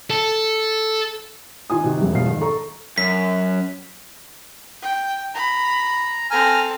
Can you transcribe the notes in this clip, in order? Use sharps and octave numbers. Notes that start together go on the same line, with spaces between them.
A4
D#3 F4 G#5 D#6
C3 D#3 F#4
E1 E3
F1 E2 B2 F3 F5 C7
G#1
A4 A#5 C#6
F#2 B6
G5
A#5 B5
C4 A4 G#5 A#5 F6